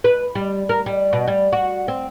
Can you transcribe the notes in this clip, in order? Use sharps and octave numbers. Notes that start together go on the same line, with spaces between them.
B4
G3
A#4
G3
B2
G3
F#4
C4